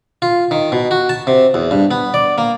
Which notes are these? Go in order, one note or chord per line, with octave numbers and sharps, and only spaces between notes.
F4
D#3
B2
F#4
A5
C3
E2
G2
B3
D5
A#3